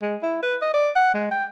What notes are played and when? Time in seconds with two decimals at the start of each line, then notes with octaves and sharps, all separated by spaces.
0.02 G#3
0.23 E4
0.43 B4
0.62 D#5
0.74 D5
0.96 F#5
1.14 G#3
1.31 G5